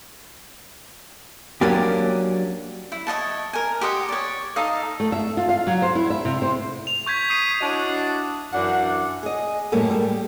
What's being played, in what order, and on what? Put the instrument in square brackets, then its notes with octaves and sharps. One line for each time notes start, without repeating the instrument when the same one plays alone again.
[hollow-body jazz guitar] F#3 A#3 C#4 D4 G4
[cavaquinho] E4
C#5 D#5 F#5 A5
A#4 G#5
G4 C5 D#5 F#5
C#5 D5
D#4 A4 D#5 F5
[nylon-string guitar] A3
E5
F4
F5
F#3
C5
E4
E5
C3
C5
[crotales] F7
C#6 G6 G#6 B6
D#6 C7 D#7
[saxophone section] D4 E4 F#4 C#5 D#5
F#2 E3 D4 F#5
[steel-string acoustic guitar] G#4 D#5
F#2 A2 G3 G#3 A#3 A4
G3